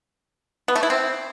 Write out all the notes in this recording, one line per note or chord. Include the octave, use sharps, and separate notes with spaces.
B3
A3
E4
C4